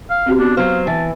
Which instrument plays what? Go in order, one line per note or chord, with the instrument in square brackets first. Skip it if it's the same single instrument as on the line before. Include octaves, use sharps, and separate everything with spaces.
[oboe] F5
[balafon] C4 F#4 G4
[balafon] B3 F#4 [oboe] D4
[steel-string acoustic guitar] F#3 C5 [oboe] F5
[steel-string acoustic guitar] E3 [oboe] A5